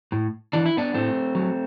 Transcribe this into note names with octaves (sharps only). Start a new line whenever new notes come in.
A2
E3 D4
E4
B3 D4
A2 A3 C4
F#3